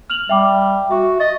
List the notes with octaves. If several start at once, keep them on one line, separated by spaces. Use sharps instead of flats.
F6 F7 F#7
G3 E5 G5 D6
F#4 E5
D#5 A6